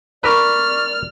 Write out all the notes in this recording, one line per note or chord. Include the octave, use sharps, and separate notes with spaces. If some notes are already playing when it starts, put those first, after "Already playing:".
A#4 B4 D5 C#6 D6 F6 B6